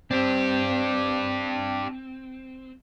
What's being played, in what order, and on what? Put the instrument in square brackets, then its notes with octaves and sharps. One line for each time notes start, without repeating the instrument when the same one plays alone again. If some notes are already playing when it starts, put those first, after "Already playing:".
[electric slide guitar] C4 [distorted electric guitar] D4 G4